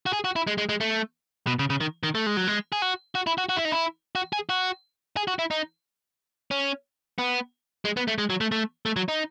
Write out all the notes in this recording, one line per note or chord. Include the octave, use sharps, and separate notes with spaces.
F#4
G#4
F#4
E4
G#3
G#3
G#3
A3
B2
C#3
C#3
D#3
D#3
A3
G#3
F#3
G#3
G#4
F#4
F#4
E4
F#4
F#4
E4
D#4
E4
F#4
G#4
F#4
G#4
F#4
E4
D#4
C#4
B3
G#3
B3
A3
G#3
F#3
A3
A3
A3
F#3
D#4